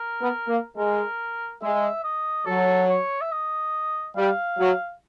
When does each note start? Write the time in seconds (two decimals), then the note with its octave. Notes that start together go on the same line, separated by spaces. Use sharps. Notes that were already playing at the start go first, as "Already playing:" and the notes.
Already playing: A#4
0.21 B3
0.48 A#3
0.77 G#3 A#4
1.62 G#3 E5
2.04 D#5
2.46 F#3 A4
2.89 C#5
3.21 E5
3.31 D#5
4.16 G3 F5
4.58 F#3